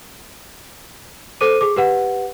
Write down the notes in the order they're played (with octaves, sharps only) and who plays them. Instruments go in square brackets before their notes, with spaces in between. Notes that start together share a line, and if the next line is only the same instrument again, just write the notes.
[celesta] A4 C5 D6 D#7
G#4 D6
G4 B4 F#5